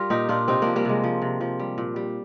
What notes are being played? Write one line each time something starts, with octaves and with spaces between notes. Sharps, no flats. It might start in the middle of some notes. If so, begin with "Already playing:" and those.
Already playing: G3 F4 A#4
A#2 D#4 G4
A#2 D4 F4
C3 C4 D#4
F3 A#3 D4
G3 A#3
C3 G#3
F3
C3
F3
G3
A#2
G3